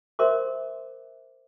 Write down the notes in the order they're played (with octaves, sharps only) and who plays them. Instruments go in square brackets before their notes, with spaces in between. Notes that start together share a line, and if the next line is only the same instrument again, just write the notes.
[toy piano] A#4 C5 E5 C6 D6